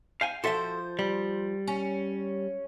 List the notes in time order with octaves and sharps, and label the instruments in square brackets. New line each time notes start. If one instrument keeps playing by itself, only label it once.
[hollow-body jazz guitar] F5 G5 G#5
[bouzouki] F3 C5 [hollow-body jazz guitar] F#4 A4 E5
[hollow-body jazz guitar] G3
[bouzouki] C#4